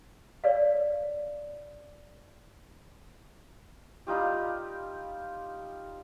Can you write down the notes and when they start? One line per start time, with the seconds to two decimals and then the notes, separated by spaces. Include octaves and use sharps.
0.44 C#5 D5 F5
4.07 G3 D#4 F4 G4